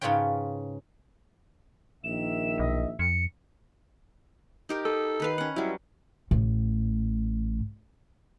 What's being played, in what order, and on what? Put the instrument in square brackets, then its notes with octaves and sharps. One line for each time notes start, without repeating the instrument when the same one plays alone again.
[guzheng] G#2 C#3 F4 B4 C#5 G5
[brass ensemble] A#1 D#3 E5 [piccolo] E7
[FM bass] B1 [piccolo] D#5
[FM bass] F2 [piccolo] C#7
[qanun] D#4 G4 A#4
[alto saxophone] A4 [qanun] D#5
[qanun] D#3 B4 F5
C#4 F#5
[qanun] F#3 G3 [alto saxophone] E4
[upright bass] A1 A2